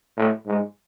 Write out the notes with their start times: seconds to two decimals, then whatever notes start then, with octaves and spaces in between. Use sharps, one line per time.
0.17 A2
0.47 G#2